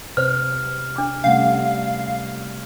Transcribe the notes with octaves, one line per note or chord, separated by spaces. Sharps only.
C3 B4 C5 F6
D4 D6
C3 G3 A3 C#4 F5 F#5